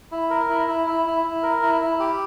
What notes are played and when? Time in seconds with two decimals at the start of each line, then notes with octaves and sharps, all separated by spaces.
0.12 E4
0.30 A#4
0.49 E4
0.68 E4
0.87 E4
1.06 E4
1.24 E4
1.43 A#4
1.62 E4
1.81 E4
2.00 G4